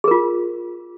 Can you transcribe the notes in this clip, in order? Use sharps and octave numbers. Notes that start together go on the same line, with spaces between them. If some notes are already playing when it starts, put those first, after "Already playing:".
F4 G#4 A#4